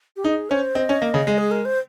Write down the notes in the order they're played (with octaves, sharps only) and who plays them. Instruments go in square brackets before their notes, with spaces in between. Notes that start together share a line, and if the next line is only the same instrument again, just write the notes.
[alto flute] G4
[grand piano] D#4 [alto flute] G#4
[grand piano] C#4 [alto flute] C5
[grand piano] C4 [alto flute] D#5
[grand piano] C#4
A#3
C#3
G#3
[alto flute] G#4
A#4
C5